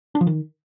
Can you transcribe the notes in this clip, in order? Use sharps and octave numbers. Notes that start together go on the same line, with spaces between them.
D4
F3
D#3